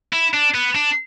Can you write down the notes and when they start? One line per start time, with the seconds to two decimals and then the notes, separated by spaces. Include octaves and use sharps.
0.13 E4
0.34 D4
0.54 B3
0.75 D4